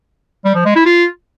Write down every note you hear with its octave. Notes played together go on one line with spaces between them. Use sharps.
G3
F3
G#3
E4
F4